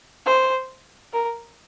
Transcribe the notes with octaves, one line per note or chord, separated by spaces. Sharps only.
C5
A#4